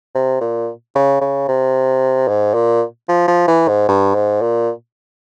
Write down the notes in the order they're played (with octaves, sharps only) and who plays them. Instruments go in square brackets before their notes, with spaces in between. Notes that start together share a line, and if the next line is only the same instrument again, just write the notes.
[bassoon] C3
A#2
C#3
C#3
C3
G#2
A#2
F3
F3
E3
G#2
G2
G#2
A#2